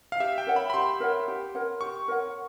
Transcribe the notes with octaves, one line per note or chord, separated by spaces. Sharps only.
F5
G4 E5
G5
A#4 C#5 F#5
B5
B5
G4 C6
A#4 C#5 F#5
G4
A#4 C#5 F#5
G4 C#6
A#4 C#5 F#5